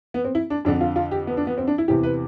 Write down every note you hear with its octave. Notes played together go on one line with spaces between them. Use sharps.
B3
C4
E4
D4
F2 D3 D4
F4
F4
G4
B3
D4
B3
C4
D4
E4
E2 C3 E3 G4
B4